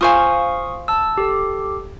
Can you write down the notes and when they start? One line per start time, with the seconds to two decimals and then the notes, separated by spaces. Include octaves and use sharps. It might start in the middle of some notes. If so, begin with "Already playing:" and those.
0.01 F4 C5 F5 G#5 C#6 D#6
0.88 A5 E6
1.17 G4 A4